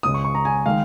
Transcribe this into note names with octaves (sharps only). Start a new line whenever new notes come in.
C#2 C#3 G#3 D#6
C#6
C#6
A#5
G#5
D#3 G#3 F5